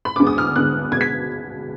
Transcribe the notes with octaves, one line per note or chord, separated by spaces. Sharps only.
B5
D2 D3 G#3 B3 D6
D#6
F6
D2 D3 G#3 B3 F#6
B2 G#3 B3 G#6
B6